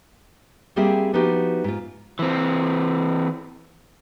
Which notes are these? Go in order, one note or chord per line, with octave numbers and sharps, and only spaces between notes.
G3 A#3 C4 G4 G#4 E5
F3 B3 D#4 E4 F#4 G4
G#2 F4
E3 C4